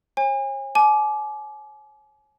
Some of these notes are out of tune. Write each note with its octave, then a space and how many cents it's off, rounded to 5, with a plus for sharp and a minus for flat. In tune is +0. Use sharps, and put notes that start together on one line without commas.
C#5 -40 G#5 -35
G#5 +40 D6 +0